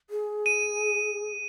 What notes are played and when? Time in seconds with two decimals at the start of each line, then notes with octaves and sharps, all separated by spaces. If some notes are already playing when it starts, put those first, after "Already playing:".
0.10 G#4
0.46 D#7